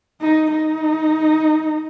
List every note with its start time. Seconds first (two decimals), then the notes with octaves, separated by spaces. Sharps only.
0.21 D#4
0.51 D#4